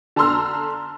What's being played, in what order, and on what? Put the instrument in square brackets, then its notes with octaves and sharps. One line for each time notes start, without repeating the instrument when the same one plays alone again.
[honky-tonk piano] D3 A5 A#5 C6 E6 F6